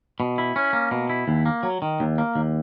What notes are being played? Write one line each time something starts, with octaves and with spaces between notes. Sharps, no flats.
B2
E4
C#4
A#3
B2
E4
D#2
A#3
F#3
D#3
D#2
A#3
D#2